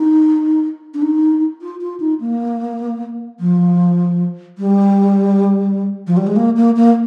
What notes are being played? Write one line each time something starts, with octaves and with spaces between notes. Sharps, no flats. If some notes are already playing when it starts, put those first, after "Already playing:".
Already playing: D#4
D4
D#4
F4
F4
D#4
A#3
F3
G3
F3
G3
G#3
A#3
A#3
A#3